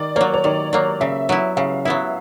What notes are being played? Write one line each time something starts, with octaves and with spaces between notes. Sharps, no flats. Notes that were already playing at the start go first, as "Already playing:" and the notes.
Already playing: D#3 D5
F#3 A#3 C#5
C#5
D#3 D5
F#3 A#3
C#3 E5
F#3 B3 E4
C#3 F5
F#3 B3 E4 E5